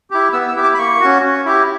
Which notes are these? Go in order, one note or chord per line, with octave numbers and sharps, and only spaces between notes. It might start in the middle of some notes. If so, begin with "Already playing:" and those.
E4 G4
B3 E6
E6
E4 G4
D6
B5
A#3 C#6
C#4 F#4
C#4
E4 G4